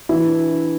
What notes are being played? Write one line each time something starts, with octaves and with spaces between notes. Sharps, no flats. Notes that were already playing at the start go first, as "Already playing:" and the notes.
E3 E4
D4